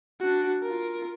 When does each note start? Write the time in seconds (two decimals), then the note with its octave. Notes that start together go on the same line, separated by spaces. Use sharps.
0.20 D4 F#4
0.63 F4 A#4